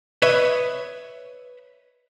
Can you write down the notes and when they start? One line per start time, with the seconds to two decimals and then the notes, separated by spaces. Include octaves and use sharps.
0.22 B4 C#5 D#5 E5